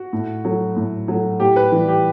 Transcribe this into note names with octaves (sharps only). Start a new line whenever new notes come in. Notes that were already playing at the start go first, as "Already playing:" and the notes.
Already playing: F#4
A2
F#3 A3
A2
F#3 A3
A2 G4
B4
E3 G3
G4